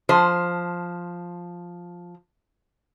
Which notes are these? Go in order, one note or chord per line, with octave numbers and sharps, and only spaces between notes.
F3 C5